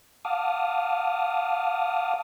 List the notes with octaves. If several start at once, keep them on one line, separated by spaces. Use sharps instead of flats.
F5 F#5 A5 D6 D#6 F6